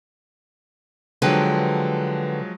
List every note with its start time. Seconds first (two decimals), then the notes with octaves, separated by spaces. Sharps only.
1.22 D3 F3 F#3 G#3 B4 G5